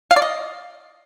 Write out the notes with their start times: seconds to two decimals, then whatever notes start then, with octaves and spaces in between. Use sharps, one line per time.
0.11 F5
0.16 D5
0.22 D#5